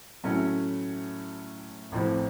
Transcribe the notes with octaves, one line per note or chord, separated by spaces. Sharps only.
A2 F#3 A3 C#4
A1 A2 F3 C4